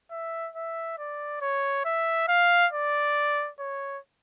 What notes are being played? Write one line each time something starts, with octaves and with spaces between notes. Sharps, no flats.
E5
E5
D5
C#5
E5
F5
D5
C#5